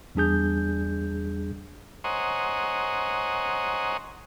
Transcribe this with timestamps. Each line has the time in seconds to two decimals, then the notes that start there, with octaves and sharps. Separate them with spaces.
0.15 E2 G3 D4 G#4 G6
2.04 C5 C#5 D#5 F#5 G#5 A#5